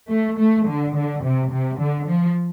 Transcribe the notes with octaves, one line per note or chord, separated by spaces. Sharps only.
A3
A3
D3
D3
C3
C3
D3
F3